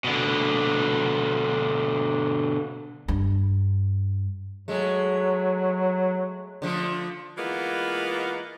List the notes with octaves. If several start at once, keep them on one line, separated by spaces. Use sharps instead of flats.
B2 D3
G2
F#3 G#3 A3
D3 F3 A3
E3 G#3 A#3 B3 F4